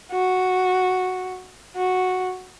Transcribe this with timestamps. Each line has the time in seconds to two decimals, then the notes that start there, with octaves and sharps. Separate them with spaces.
0.12 F#4
1.77 F#4